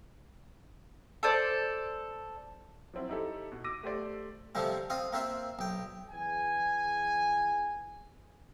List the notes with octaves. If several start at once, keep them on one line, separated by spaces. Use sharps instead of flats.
A4 C5 D5
F3 F#3 C4 E4
D#4 E4 G4 A4
B2
D6 E6 A#6 D#7
A3 G4 C5 D5
C3 F3 G3 A3 C4
C4 F4 D#5
A#3 C4 F4 E5
B1 G5
E2 G#5